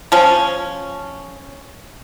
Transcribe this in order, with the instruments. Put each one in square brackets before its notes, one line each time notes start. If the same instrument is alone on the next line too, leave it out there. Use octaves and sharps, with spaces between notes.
[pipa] F3 C#4